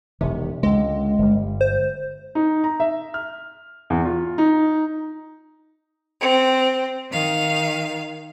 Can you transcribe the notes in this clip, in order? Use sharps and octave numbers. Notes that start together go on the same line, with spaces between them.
E1 C3 D#3
C#2 D3 G#3
G1 G3
C5
D#4
A#5
E5
F6
E2
F4
D#4
C4
D#3 F5